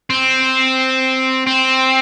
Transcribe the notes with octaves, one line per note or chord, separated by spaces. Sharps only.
C4
C4